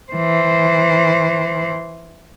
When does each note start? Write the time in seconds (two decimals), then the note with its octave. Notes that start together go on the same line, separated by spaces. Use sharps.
0.12 E3 C5